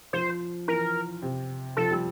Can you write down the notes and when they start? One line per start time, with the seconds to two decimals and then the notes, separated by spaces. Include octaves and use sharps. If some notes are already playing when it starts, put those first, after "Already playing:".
0.13 F3 C5
0.68 E3 A#4
1.22 C3
1.77 F3 A4
1.91 G3